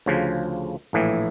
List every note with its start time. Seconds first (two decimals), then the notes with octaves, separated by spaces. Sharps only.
0.06 D2 C#3 F3
0.93 A#1 A2 E3